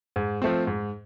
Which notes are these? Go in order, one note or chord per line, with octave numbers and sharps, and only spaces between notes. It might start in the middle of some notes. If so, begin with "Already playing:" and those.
G#2
F3 A3 C4
G#2